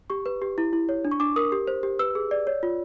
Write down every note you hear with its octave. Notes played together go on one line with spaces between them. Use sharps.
G4 C#6
B4
G4
E4
E4
C#5
D4
C#6
D4 D6
A#4 D#6
G4
C5
G4
B4 E6
G#4
D5
C#5
F4